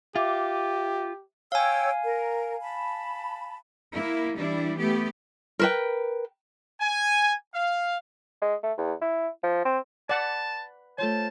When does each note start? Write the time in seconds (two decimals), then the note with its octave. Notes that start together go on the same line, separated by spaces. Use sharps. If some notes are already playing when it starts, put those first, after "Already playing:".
0.16 F4 G4 E5 D6
1.52 C#5 F5 G5 G#5 E6
2.05 A#4
2.62 A5 B5
3.94 A#3 E4
4.35 E3 G3 D4 E4
4.78 A3 B3 G4
5.59 A#4 B4 G5
6.80 G#5
7.55 F5
8.42 G#3
8.63 A3
8.78 E2
9.01 E4
9.43 F3
9.65 C4
10.09 B4 D5 F#5 A5
10.98 A3 F4 A4 C5 C#5 A5